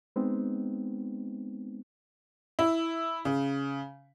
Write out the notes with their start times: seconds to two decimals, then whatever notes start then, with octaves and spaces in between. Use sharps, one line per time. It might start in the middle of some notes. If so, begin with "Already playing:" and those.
0.16 G#3 B3 C4 D#4
2.59 E4
3.25 C#3